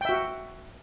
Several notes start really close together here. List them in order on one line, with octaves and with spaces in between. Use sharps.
G5 E5 F#4